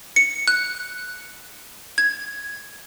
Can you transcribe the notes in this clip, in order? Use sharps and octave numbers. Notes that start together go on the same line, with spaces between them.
C#7
F#6
G#6